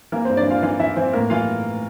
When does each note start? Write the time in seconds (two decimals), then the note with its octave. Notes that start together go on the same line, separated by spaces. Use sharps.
0.12 E3 A#3 A#4
0.25 C4 C5
0.30 G2
0.37 D4 D5
0.47 E3 F4 F5
0.62 E3 F4 F5
0.79 E3 E4 E5
0.96 E3 C4 C5
1.13 A2 A#3 A#4
1.30 E3 F4 F5